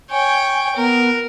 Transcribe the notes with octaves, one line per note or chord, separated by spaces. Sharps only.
C#5 G5 G#5
B3 A#4